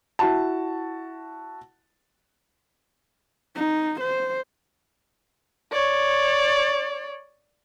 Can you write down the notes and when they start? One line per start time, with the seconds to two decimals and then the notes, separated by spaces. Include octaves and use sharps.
0.19 E4 F#4 A5
3.55 D#4
4.01 C5
5.72 C#5 D5